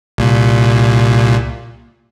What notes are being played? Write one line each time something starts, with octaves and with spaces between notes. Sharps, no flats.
C2 A#2